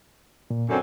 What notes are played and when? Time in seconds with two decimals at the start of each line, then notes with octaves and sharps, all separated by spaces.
0.50 A#2
0.69 F#2 D3 C4